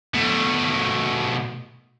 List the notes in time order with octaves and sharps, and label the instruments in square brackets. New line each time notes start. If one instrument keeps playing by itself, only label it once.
[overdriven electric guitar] B2 A3